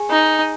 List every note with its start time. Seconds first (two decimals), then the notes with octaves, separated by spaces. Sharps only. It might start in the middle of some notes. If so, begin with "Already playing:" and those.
Already playing: G#4 G#5
0.10 D#4